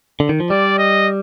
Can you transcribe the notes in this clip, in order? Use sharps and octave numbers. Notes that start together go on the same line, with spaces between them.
D3
D#3
F3
G3 D5
D#5